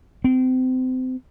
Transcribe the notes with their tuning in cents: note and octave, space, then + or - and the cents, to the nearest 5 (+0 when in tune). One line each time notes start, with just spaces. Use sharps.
C4 -30